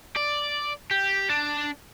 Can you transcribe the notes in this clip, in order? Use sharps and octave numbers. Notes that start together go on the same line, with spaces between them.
D5
G4
D4